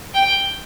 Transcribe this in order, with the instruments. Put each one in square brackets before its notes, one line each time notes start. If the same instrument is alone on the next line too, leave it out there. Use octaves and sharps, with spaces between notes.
[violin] G5